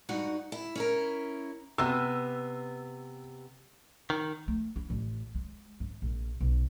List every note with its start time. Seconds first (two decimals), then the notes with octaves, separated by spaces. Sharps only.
0.09 G2 D#4 F#4 F#5
0.52 E4
0.75 C#4 E4 A#4
1.78 C3 B3 E6
4.10 D#3
4.48 A3
4.76 E4
4.90 A1
5.35 G#3
5.80 G#2
6.02 A#1
6.41 B1